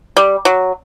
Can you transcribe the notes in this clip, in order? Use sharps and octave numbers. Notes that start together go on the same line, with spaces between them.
G3
F#3